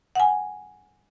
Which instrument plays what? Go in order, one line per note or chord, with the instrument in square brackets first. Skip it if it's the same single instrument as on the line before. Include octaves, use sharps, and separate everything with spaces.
[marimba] F#5 G#5